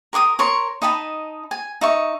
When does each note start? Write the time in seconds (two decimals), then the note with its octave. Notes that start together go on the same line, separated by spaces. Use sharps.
0.13 A#4 C6 D6 D#6
0.39 A#4 C#5 C6 C#6
0.82 D#4 D#5 A5 B5
1.51 G#5
1.81 D#4 E5 C#6